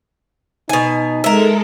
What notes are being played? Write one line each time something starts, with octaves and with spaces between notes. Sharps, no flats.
B2 D#4 G#5
G#3 A4 A#4 E5